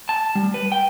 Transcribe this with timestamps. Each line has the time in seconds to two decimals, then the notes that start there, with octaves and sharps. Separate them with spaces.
0.09 A5
0.35 G3
0.54 B4
0.72 G5